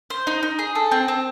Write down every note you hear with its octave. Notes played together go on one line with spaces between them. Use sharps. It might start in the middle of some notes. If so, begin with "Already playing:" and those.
C5
D#4
D#4
G#4
A4
C4
C4